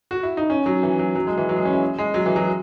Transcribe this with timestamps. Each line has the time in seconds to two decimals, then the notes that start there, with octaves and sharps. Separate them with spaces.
0.11 F#4
0.23 E4
0.37 D#4
0.50 C#4
0.66 F#3
0.83 E3
0.99 F#3
1.15 F#3
1.27 G#3
1.37 E3
1.49 F#3
1.56 G#3
1.65 C#4
1.73 E4
1.98 G#3
2.14 F#3
2.26 E3
2.36 F#3